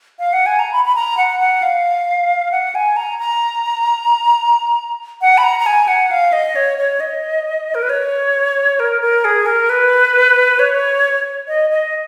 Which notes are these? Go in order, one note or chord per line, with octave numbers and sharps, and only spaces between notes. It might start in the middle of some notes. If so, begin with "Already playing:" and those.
F5
F#5
G#5
A#5
B5
B5
A#5
F#5
F#5
F5
F#5
G#5
A#5
A#5
F#5
B5
A#5
A#5
G#5
F#5
F5
D#5
C#5
C#5
D#5
A#4
B4
C#5
A#4
A#4
G#4
A#4
B4
C#5
D#5
D#5